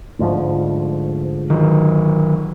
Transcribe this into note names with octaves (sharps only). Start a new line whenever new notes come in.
D2 G#2 F3
D#3 F#3